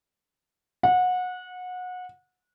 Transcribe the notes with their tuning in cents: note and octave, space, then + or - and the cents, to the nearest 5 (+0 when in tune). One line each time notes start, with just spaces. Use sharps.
F#5 -25